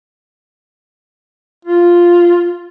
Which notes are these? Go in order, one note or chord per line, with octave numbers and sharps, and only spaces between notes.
F4